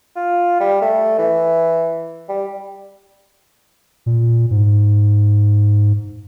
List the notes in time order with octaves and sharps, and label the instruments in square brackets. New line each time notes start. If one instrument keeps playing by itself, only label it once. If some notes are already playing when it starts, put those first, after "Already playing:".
[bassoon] F4
G3
A3
E3
G3
[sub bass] A#2
G#2